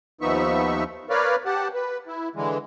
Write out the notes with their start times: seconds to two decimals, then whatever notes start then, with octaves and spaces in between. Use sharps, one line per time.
0.21 D#2 F3 B3 D#4 E5 C#6
1.10 A#4 B4 C#5 D5 F5
1.46 G4 F#5 A5
1.74 B4
2.07 E4
2.36 D3 E3 G#3